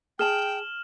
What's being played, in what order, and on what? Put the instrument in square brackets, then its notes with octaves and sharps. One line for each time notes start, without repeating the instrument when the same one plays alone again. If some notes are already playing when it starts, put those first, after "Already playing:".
[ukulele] G#4 A5 [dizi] G5 [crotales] F6 E7 F#7